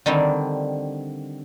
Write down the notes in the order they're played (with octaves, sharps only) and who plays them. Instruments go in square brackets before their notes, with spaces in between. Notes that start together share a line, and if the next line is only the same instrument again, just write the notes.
[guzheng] D3 D#3 G3 C4